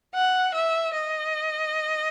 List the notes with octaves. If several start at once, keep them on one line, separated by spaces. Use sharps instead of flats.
F#5
E5
D#5